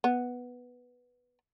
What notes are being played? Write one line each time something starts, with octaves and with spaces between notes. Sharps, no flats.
B3